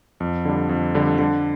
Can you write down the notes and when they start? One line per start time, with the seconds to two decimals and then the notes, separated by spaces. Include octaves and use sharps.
0.20 F2
0.45 D3 G3
0.69 F2
0.95 D3 G3
1.19 D3